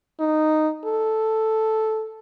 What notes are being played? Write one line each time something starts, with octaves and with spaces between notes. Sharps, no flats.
D#4
A4